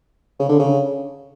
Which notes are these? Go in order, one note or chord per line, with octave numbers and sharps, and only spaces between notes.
C#3
D3
C#3